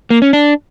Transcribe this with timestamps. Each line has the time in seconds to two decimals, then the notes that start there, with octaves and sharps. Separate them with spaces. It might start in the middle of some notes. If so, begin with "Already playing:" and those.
0.10 A#3
0.22 C#4
0.33 D4